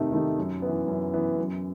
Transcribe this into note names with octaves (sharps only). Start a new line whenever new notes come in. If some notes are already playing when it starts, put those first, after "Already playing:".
Already playing: C3 D#3 A3 D#4 G4
D#3 A3 D#4 G4
F#2
E3 B3
F#2
E3 B3
F#2